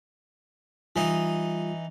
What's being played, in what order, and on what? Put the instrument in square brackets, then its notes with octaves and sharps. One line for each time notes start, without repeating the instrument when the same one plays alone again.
[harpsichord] E3 D#4 [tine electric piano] G3 F4